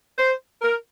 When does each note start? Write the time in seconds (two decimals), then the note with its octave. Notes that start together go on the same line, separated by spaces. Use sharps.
0.19 C5
0.62 A#4